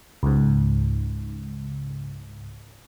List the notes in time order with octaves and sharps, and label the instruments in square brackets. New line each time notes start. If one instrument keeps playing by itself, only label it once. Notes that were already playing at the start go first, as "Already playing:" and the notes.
[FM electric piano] C#2 G#2